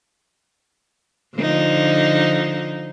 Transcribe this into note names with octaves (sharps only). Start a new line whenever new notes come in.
D3 F3 D#4